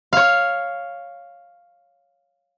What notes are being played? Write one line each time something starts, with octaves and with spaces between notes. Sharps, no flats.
C#5 F5